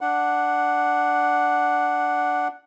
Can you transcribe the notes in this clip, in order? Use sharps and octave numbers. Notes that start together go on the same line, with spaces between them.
D4 F#5